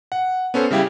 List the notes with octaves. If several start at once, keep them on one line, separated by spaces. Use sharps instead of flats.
F#5
B3 C#4 A4 C5
C#3 G3 E4 G4 F5